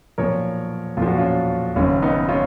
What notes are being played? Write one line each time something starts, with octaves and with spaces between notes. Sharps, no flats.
B1 A#2 F3 A#4 C#5
B1 A#2 F3 F4
F#4
C#4 F4
F#1 F#2 D#3 C#4 F4
B3 D#4
C#4 F4